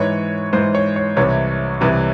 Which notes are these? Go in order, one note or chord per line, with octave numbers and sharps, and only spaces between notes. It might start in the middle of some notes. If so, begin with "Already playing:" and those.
Already playing: G#2 E3 C#5
G#2 E3 C5
C#5
C#5
C2 C3 E3 C#5
C2 C3 E3